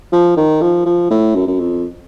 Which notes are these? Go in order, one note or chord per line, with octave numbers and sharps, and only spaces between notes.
F3
D#3
F3
F3
A2
F#2
F#2
F2